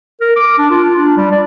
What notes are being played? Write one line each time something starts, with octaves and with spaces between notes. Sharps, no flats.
A#4
D6
D4
F4
D4
G3
D5